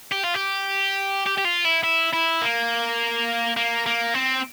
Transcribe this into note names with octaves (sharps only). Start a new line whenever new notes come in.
G4
F4
G4
G4
G4
F4
E4
E4
E4
A#3
A#3
A#3
C4